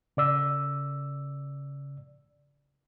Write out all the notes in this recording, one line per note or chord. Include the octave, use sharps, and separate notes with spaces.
C#3 D5 E6